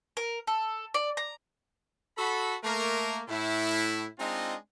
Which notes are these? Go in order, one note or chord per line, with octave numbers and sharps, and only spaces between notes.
A#4
A4
D5
A#5
F#4 A4 B5
A3 A#3 A#4
A2 E4
G#3 C4 D4 D#4 F4 D#5